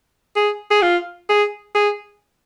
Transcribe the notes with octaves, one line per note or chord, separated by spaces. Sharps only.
G#4
G#4
F4
G#4
G#4